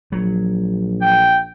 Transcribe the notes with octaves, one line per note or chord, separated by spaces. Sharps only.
A#1 F#3
G5